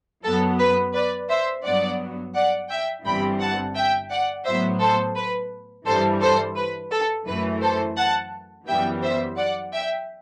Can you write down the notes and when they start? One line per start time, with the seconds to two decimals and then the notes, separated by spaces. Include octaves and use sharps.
0.24 F#2 F#3 B3 A4
0.59 B4
0.94 B4 D5
1.30 C5 E5
1.65 G2 F#3 B3 D5 F#5
2.35 D5 F#5
2.70 E5 G5
3.05 G1 G2 E3 G3 C4 G5 B5
3.41 F#5 A5
3.76 E5 G5
4.10 D5 F#5
4.46 A2 F#3 B3 C5 E5
4.81 A4 C5
5.16 B4
5.87 G2 E3 G3 A4 C5
6.21 A4 C5
6.57 B4
6.92 A4
7.27 F#2 E3 A3 B4
7.62 A4 C5
7.97 F#5 A5
8.68 F#2 E3 G3 B3 E5 G5
9.02 C5 E5
9.37 D5 F#5
9.73 E5 G5